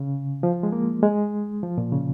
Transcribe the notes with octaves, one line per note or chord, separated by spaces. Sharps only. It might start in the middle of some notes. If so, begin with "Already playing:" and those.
Already playing: C#3
F3
G#3
A#3
G#3
F3
A#2
C#3